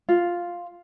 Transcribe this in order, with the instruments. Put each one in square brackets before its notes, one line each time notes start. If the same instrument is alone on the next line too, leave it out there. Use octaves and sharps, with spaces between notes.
[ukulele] F4